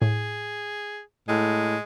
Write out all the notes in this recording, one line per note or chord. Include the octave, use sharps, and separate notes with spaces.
A2 G#4
A2 G#3